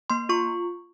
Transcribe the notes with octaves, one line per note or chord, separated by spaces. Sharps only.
A#3 C6
F4 C#6